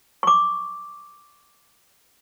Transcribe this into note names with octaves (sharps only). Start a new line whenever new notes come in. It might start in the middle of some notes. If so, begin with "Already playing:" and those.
C#6 D6